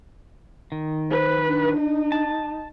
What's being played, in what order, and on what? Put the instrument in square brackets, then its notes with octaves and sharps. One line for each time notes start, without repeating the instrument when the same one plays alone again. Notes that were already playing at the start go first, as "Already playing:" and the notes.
[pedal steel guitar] D#3
[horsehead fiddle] B4 [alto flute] C5
[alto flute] D4
[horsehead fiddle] D#4
[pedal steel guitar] A5